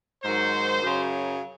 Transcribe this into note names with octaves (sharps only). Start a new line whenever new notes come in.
G#2 D#3 F#3 C5
F#2 C#3 F#3